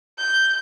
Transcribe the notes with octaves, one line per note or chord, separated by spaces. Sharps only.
G6